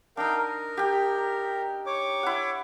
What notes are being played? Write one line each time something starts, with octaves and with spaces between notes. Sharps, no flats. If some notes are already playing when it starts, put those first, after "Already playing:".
D4 D#4 A#4 F5 G5
A#4
G4 G5
C#5 D6
E4 F#5